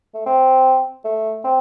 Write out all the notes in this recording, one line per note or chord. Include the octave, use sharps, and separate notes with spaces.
A3
C4
A3
C4